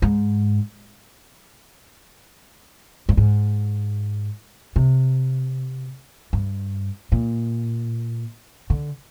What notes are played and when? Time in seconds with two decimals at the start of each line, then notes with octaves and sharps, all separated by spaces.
0.02 G#2
3.09 G2
3.17 G#2
4.76 C3
6.33 G2
7.12 A#2
8.70 D3